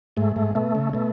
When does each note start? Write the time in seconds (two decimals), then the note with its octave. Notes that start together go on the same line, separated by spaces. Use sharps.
0.17 G#2 A3
0.36 G#2
0.55 B2 A3
0.75 C#3
0.93 B2 A3